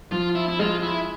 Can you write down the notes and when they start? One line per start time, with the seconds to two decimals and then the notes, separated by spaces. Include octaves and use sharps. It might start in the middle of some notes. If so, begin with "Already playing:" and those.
0.11 F3 F4
0.35 E4
0.48 E4
0.59 G#3 F4
0.82 E4